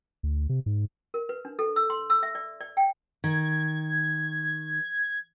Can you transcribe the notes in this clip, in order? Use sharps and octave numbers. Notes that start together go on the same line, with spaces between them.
D2
C3
G#2
A#4
B4
D4
A4
E6
C6
E6
E5
D5
D5
G5
D#3 G#6